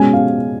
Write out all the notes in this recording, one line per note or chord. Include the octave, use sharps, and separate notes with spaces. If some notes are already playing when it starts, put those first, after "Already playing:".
Already playing: B2 G#3 C#4 G#5
F5